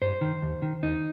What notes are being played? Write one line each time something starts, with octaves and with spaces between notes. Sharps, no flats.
G2 C5
D#3
D#2
D#3
D#2 D#4